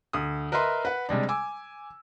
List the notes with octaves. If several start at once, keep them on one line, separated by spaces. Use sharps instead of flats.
D2 D#6
A#4 B4 D#5 E5 A#5 C6
B4 F#5
C3 G3 G#3 D4
G#5 D6 E6